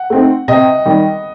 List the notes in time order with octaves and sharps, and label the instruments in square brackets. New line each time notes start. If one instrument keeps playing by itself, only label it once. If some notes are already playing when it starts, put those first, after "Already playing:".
Already playing: [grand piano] F#5
[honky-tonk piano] A3 C4 D#4
[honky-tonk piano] C3 [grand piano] D#5
[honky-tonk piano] D#3 G3